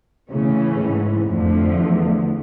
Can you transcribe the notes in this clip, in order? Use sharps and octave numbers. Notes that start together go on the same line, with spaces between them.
A2 C#3 E3 A3 C#4
G#2
F2 D3 F3 A3
E2